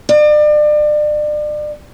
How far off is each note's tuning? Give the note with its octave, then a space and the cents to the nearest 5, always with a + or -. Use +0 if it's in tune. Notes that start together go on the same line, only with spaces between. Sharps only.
D5 +35